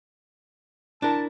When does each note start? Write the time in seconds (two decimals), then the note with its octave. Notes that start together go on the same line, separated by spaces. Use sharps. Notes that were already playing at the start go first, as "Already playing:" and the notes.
1.02 D4 E4 A#4 A5